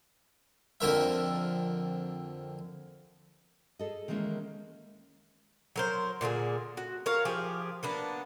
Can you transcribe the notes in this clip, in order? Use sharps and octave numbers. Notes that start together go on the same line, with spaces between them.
F2 D3 A#4 E5
G#4 A4 D#5
D#3 E3 G#3 A#3 C#4
F#3 A#4 C5
A#2 D3 A#3 G#4
F#4
A#4 C#5 F5
F3 G4 G#4
A#3 B3 D4